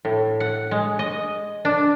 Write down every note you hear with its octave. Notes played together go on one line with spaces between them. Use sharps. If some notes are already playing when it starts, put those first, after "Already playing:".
A2
F#5
G#3
D#5
D4